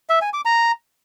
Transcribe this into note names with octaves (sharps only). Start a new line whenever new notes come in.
E5
G#5
D6
A#5